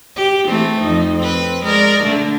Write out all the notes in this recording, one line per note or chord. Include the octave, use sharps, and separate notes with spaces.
G4
E3 A3 C4
F2 D#4
C4 B4
G#3 A#4 D5
D3 A3